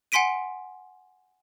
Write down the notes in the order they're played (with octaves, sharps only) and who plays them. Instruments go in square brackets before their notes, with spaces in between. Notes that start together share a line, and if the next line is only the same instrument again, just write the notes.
[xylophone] F#5 G#5 C6 B6 D7 D#7